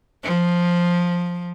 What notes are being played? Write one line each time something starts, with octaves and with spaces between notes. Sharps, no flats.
F3